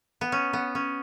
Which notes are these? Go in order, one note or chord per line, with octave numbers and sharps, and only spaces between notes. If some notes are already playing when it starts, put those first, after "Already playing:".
B3
C#4
B3
C#4